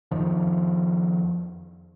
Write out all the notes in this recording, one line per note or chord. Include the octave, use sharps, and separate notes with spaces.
F2 D#3 F3